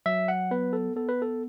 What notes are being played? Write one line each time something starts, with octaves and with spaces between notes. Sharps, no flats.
F#3 E5
F#5
B3 B4
A4
B3 A4
B4
A4